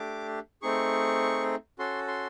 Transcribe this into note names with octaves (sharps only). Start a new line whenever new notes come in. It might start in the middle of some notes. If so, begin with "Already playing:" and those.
Already playing: A3 D4 G4 D6
A3 C4 D#4 G#4 C#6
C#4 F#4 A4 C6
C6